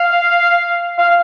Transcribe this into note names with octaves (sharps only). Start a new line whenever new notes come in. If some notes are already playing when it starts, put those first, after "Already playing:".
Already playing: F5
F5